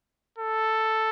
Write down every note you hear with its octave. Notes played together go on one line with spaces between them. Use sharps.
A4